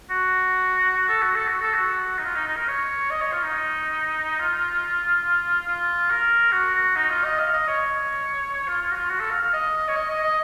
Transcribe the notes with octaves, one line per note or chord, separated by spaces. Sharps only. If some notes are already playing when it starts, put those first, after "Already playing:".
F#4
F#4
A4
F#4
A4
F#4
A4
F#4
D#4
F4
D#4
D#4
A#4
C#5
D#5
C#5
F4
D#4
F4
F4
A#4
F#4
D#4
F4
D#5
F5
D#5
C#5
F4
F4
F#4
F4
F#4
A4
F5
F5
D#5
C#5
D#5
D#5
D#5